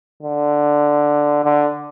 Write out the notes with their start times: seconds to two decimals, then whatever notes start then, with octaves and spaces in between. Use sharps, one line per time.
0.23 D3
1.44 D3